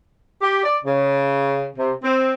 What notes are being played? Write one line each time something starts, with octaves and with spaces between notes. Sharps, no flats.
G4
D5
C#3
C3
C4